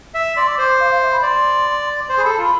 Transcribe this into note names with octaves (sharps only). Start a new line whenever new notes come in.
E5
D5 C6
D6
C5 D6
D6
F5
F5
E5
B5
D5 C6
C5 C6
G#4
A4 B5
A5
F4 B5